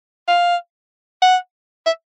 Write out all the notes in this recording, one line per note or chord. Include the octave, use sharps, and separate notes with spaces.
F5
F#5
E5